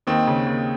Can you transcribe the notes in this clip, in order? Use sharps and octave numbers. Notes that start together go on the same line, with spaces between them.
D#2 C4 D#4
C#3
D#2